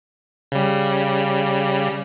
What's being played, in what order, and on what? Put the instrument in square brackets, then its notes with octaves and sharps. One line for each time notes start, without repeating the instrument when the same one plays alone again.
[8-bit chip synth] C#3 G3